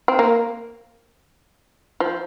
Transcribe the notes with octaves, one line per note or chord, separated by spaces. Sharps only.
C4
A#3
F3